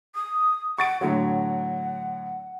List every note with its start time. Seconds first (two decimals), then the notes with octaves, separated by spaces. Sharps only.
0.15 D#6
0.78 F#5 C#6 A6 D7
1.01 A2 D3 F#3 F#5